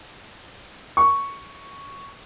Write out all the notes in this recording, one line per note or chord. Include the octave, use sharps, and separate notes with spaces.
C#6